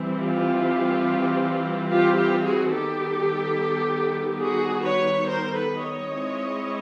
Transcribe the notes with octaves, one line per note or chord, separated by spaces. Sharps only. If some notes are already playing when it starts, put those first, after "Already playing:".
Already playing: E3 G3 C4
F4 G4
F4 G4
F4 G4
F#4 G#4
D#3 G3 B3 G4 A4
F#4 G#4
B4 C#5
A#4 C5
A4 B4
C#5 D#5
G#3 C4 E4